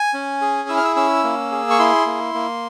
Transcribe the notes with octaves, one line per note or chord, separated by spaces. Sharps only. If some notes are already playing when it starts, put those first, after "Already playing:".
Already playing: G#5
C#4
G#4
E4 E6
F6
E6
C#4 E6
A#3
G#4
C#6
E4 C6
A#3
A#3